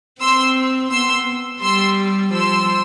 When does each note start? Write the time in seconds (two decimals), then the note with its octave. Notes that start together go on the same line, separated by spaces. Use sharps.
0.21 C4 C6 E6
0.92 B3 C6 E6
1.62 G3 C6 E6
2.33 F3 C6 E6